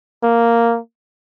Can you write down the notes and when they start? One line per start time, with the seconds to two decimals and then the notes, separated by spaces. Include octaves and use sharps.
0.23 A#3